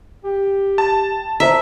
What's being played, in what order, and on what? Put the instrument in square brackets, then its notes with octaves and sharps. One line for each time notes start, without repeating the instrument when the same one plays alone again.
[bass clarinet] G4
[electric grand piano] A5
[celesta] C5 A5 A#5 [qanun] E5